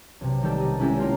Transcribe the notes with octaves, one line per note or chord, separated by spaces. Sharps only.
B1 C3
D#3 G3 A3 G4 A4
D#5
G#3 C#4 E4 G4 A4
A3 A#3 F4 G4 A4 A#4